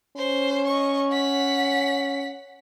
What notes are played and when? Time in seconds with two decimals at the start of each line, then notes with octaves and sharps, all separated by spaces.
0.17 C#4 C5
0.67 D#5 C#6
1.09 F#5 B6